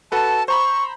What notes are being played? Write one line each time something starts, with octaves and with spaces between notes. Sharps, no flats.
F#4 A4 B4 A5
C5 A#5 B5 C#6